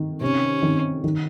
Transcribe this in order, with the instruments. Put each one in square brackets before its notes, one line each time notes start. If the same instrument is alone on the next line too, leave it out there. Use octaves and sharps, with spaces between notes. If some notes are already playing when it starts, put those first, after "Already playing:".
Already playing: [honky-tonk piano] D#3
[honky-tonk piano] C3 [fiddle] C#4
[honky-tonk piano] D#3
D#3